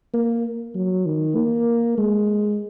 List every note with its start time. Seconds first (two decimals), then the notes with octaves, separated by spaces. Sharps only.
0.14 A#3
0.75 F#3
1.06 D#3
1.36 A#3
1.98 G#3